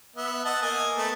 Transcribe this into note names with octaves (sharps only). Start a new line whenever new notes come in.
B3 E5
D#5 F#5 A5
A#3 D#5 G#5
A3 B3 A5